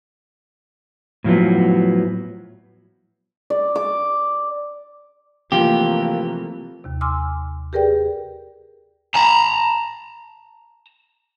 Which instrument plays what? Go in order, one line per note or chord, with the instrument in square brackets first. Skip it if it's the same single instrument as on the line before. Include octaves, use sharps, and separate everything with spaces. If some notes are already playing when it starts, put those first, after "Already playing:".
[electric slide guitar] A2 F3 F#3 B3
[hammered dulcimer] D5
D6
[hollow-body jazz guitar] C3 F3 [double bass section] E3 A3 A#3 [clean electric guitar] G4 [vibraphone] A#4 F5
[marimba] D#2 C3
G#5 C6 D6 E6 F6
G4 G#4 A#4 B4 D5 G5
[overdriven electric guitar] A5 A#5